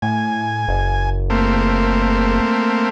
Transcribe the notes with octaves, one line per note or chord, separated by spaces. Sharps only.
A2 G#5
F#1
A3 A#3 C4